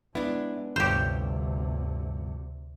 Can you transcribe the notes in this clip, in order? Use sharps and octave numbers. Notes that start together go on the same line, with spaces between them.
G#3 B3 D4 E4
G1 D2 C3 G4 C5 C#5